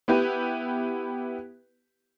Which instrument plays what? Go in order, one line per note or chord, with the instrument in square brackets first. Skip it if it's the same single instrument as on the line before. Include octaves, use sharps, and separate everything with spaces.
[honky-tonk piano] B3 E4 G4 B4